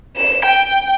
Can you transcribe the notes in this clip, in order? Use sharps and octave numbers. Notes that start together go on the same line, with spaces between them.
E7
G5